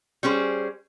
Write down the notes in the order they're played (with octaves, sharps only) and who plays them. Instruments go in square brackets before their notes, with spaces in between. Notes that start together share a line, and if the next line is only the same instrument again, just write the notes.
[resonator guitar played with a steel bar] G3 C#4 G#4 C5